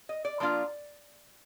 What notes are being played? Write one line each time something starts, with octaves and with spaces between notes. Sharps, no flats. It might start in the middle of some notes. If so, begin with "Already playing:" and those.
D#5
D5
F3 A#3 D4 F4